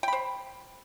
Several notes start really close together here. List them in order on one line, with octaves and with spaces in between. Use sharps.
G5 B5 C5